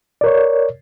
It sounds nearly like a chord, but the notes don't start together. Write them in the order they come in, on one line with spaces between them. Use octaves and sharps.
D5 A#4 C#5